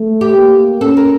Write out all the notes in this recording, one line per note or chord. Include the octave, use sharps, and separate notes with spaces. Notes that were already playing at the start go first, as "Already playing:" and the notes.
Already playing: A3
G4
A#3
C#4 A4
A#4